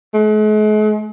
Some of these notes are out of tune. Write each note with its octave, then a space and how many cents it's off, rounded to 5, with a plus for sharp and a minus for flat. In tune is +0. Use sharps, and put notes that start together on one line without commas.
G#3 +45